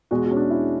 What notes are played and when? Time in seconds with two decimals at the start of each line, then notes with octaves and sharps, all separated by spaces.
0.11 E2 B2 G#3 F#4
0.24 F#4
0.31 C#4
0.37 D4
0.50 E4